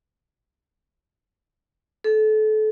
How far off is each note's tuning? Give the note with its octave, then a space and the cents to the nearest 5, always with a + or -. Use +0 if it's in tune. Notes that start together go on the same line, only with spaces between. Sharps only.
A4 -30